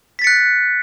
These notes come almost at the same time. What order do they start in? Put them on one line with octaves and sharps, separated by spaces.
B6 A6 C#7 F#6